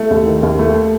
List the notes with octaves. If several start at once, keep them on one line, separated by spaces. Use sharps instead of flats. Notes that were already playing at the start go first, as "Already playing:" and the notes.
Already playing: A3
D#2
D#3
D#2
A3